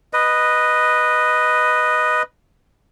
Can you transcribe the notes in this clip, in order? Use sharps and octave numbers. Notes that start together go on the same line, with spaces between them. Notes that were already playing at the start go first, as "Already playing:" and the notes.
B4 D#5